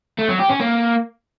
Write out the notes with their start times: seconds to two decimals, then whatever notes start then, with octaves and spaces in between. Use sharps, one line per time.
0.19 A3
0.29 F#3
0.40 G4
0.50 C#4
0.60 A#3